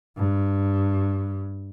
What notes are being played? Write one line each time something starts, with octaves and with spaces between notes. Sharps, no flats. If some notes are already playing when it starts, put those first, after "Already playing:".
G2